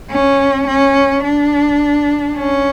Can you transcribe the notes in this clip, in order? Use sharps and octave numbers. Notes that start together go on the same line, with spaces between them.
C#4
C#4
D4
C#4